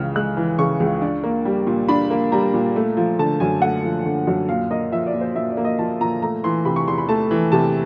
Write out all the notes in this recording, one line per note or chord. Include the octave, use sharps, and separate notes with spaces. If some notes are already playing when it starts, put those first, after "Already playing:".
Already playing: C#2 C#3 E3 F6
G#3 F#6
E3
C#3 C#6
C#2
D4
A#3
G3
A#2
D4 B5
A#3
G3 A#5
A#2
A3
F3
D3 A5
F#2 G#5
A3 F#5
F3
D3
F#2
A#2 F5
A#3 D#5
F3 E5
D5
A#2
C5
A#2 E5
D5
A#3
D#5
F3 A5
A#2 A#5
A3 A#5
E3 C6
C3 B5
C#6
E2 C6
B5
A3 A5
E3
C3 A5